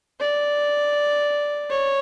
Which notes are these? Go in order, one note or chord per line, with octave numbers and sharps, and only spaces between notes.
D5
C#5